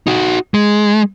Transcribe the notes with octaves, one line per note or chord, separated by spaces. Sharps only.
D#4 F#4
G#3